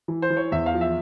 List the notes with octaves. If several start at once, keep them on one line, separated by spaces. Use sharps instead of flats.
E3
C5
E3
C#5
E2 E5
F5
F3
E5